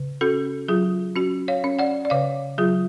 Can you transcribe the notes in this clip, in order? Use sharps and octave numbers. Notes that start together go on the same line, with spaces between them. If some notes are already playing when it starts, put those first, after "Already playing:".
Already playing: C#3
C#4 F#4 A4
F#3 F4 G#4
C#4 F#4
C#5 F5
C#4
D5 F#5
D5
C#3 C#5 F5
F#3 F4 G#4